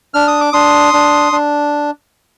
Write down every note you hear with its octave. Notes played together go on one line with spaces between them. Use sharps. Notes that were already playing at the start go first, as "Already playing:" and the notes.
D4 F6
D#6
D6
D4 C6 D#6
D4
D4